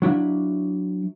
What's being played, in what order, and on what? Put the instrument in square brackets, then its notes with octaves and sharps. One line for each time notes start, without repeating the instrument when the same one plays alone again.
[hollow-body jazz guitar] F#3 D4 E4 F5